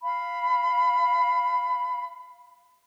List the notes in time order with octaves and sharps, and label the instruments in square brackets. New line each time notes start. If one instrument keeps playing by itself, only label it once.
[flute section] F5 B5